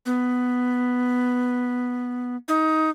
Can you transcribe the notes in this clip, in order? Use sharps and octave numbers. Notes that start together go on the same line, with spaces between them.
B3
D#4